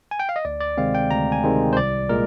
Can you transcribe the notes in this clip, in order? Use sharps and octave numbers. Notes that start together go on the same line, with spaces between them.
G#5
G5
F5
D#5
D2 D5
D5
C3 D#3 G#3 C4 F5
G5
D2 A#5
G#5
C3 D#3 G#3 C4
C5
C2 D5
A#2 G#3 A#4